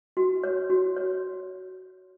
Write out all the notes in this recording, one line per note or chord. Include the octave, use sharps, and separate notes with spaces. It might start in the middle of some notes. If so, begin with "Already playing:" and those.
F#4
C#5
F#4
C#5